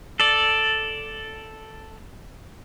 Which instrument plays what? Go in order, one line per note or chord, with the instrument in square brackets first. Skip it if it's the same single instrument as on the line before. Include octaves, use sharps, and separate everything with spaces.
[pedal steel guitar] A4 D5